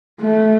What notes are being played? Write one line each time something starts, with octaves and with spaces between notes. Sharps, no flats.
A3